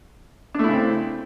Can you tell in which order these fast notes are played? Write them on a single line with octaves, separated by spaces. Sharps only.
D4 A3 E4 C#3 C4